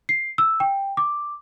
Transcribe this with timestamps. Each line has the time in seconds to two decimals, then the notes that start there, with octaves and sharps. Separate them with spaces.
0.09 C7
0.38 E6
0.60 G5
0.97 D6